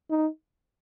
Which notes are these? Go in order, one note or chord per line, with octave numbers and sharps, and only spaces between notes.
D#4